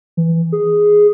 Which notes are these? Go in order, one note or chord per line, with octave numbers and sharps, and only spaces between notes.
E3
G#4